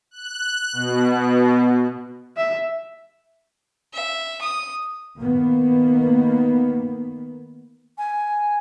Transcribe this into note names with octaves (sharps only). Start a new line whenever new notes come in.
F#6
B2
E5
E5
D#6
D#3 A#3 B3
G#5